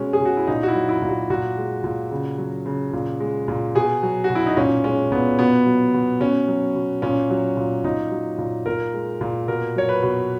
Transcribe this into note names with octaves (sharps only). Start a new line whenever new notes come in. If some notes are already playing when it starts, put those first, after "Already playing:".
Already playing: B2 G#3 C#4
G#4
B2 F#4
E4
A#2 D#4
F#4
E4
F#3
E4
A#2
F#4
A#2 F#4
G#3
A#2
C#3
F#3
C#3
A#2
G#3
A#2
B2 G#4
F#3
F#4
B2
E4
D#4
A#2 C#4
G#3 C#4
A#2 B3
B2 B3
F#3
B2
B2 C#4
F#3
B2
A#2 C#4
F#3
A#2
A#2 D#4
F#3
A#2
A#2 A#4
G#3
A#2
B2 A#4
F#3 C#5
B4
B2